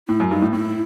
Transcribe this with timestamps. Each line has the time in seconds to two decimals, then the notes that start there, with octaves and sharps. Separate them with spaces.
0.09 A2 E4
0.20 F#2
0.31 G2 D#4
0.42 A2
0.53 A2 E4